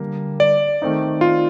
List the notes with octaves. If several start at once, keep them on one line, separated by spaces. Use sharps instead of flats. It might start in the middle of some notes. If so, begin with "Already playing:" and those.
Already playing: D3 G3 A#3
D5
D#3 A3 C4 D#4
F4